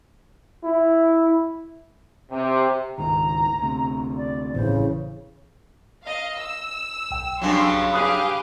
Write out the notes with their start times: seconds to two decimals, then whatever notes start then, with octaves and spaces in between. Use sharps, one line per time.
0.64 E4
2.30 C3
2.98 C#2 G#2 D#3 A#5
3.58 D2 C3
4.17 D5
4.55 A1 C#3 E3 C5
6.03 D#5 F5
6.36 E6
7.11 B1 G5
7.42 G2 C#3 F#3 C6
7.93 G4 G#4 F5 B5 D#6 F#6